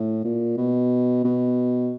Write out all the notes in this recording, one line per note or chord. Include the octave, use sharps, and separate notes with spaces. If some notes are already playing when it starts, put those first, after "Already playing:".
Already playing: A2
A#2
B2
B2